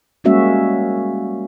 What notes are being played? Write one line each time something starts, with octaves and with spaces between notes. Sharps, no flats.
G3 G#3 A#3 C#4 F#4 E5